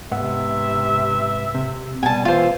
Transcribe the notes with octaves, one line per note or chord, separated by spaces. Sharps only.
G#2 C3 B3 E5 F#5
C3
B2 G3 G#5 A5
E3 F4 C5